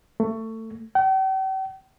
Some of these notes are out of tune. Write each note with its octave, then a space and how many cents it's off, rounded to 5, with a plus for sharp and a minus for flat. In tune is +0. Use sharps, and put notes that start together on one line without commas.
A3 +25
G5 -45